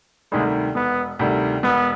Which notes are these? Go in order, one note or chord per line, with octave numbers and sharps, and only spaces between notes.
D2 C3 D#3 G3 G#3
E1 B3
D2 C3 D#3 G3
E1 B3